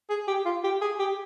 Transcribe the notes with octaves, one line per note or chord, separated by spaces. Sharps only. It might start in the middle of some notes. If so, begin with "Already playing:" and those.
G#4
G4
F4
G4
G#4
G4